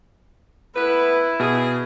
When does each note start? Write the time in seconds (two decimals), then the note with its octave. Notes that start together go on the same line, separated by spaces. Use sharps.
0.76 A3 B3 E4 B4
1.40 B2 G#4